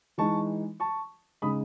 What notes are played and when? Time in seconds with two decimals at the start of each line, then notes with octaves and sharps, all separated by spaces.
0.18 E3 G#3 D#4 A5 C#6
0.80 A5 C#6
1.42 C#3 G#3 D#4 B5 D#6